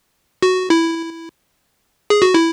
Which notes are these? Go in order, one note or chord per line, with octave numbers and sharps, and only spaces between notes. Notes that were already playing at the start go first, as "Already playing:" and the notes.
F#4
E4
G#4
F#4
E4